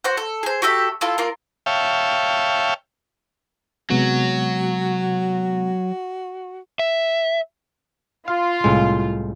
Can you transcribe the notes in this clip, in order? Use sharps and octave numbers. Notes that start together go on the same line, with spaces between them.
F#4 C5 F#5
A4
G#4 C5
F#4 G4 A4 E5
E4 F4 A4
A#3 F4 A#4
C#5 E5 F5 G5 A5
C3 F#3 G#3 B3 F#4
E5
F4 F5
C2 A2 G#3